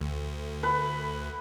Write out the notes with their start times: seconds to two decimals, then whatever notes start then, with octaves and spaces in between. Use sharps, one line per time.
0.01 D2
0.63 B4